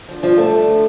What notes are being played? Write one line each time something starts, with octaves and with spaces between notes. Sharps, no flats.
D3 F3
G2 F3 F4
D3 G3 A3 A4
D2
D3 F3